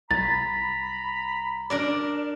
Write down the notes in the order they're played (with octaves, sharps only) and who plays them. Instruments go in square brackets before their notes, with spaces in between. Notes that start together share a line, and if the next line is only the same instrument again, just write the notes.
[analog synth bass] C2 [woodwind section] A#5 B5 [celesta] A6
[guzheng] D4 A#4 D5